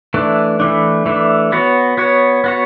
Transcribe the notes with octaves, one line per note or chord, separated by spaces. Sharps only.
E3 A3 D4
E3 A3 D4
E3 A3 D4
B3 F#4 C#5
B3 F#4 C#5
B3 F#4 C#5